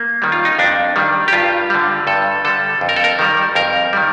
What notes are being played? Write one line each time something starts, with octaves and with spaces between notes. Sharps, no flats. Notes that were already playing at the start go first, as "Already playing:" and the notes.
Already playing: A#3
D#3 G3
F4
D#4
F2 D4
D#3 G3
G4
G2 F4
D3 G3
G2 A4
D3 G3 A4
F2
A#4
A4
A#4
D#3 G3
F2 A#4
D#3 G3